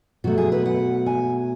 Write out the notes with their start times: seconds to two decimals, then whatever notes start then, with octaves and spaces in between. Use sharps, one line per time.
0.24 B2 F#3 A3 F#4
0.38 G#4
0.52 B4
0.66 F#5
1.06 G#5